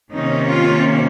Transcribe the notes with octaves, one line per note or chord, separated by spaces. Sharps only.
C3 D#3 A#3 C#4 D#4
F4